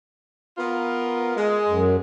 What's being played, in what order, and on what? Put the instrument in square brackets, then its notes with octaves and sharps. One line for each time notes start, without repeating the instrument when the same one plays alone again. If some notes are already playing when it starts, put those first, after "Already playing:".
[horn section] B3 F4 A#4
G#3
[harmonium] F#2